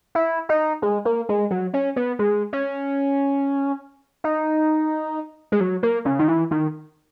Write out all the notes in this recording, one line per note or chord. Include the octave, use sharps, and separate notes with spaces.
E4
D#4
G#3
A#3
G#3
F#3
C#4
B3
G#3
C#4
D#4
G#3
F#3
A#3
C#3
D#3
E3
D#3